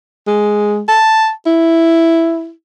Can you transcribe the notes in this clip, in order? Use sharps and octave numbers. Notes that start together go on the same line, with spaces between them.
G#3
A5
E4